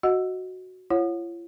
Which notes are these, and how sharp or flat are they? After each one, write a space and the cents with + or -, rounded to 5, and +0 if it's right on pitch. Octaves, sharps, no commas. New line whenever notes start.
F#4 +0 D#5 +10 F#5 -15
F4 -45 C#5 -15 F#5 -35